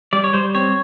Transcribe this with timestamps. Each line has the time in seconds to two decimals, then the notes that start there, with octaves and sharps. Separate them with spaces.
0.13 G3 D5
0.24 C#5
0.33 G3 C5
0.55 C4 C#5